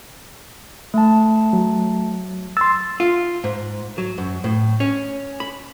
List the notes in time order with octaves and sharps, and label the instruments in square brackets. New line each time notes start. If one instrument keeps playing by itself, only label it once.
[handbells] A3 A5
[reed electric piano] F#3
[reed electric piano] C6 E6 [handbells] A6
[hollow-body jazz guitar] F4
G#2
F#3
F#2
A2
C#4
B5